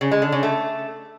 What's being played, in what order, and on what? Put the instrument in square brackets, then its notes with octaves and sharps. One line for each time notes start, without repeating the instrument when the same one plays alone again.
[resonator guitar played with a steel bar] C#3
G#3
D3
C#3
A3